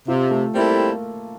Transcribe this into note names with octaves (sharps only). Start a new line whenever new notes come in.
C3 F4
A3
G3 A#3 C4 E4 A4